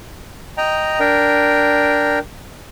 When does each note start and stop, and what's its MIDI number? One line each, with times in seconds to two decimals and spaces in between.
0.57 0.99 75
0.57 0.99 79
0.57 0.99 82
1.00 2.19 62
1.00 2.19 70
1.00 2.19 79